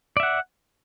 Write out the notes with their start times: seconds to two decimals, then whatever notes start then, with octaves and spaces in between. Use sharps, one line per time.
0.17 D5
0.20 E5
0.23 F#5